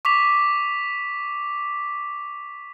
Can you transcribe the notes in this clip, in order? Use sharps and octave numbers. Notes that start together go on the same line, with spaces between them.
C#6 D6 B6 F7